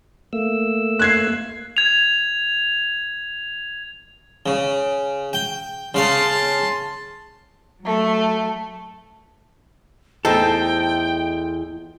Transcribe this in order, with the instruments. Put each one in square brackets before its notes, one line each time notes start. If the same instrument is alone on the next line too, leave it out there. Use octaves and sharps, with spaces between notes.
[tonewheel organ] A3 A#3 E6
[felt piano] F#6 G#6 C7
[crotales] G#6 F7
[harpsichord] C#3
G5
[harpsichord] C#3 F5 [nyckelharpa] A5 C6
[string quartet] F#3 A3
[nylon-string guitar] E2 A3 [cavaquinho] D#4 C5 A5 [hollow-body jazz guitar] A4 [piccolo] G5